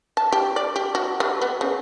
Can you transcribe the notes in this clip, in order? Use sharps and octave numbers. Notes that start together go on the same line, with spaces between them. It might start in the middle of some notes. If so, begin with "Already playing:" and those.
A5
G4
D5
G4
F#4
G3
B3
C#3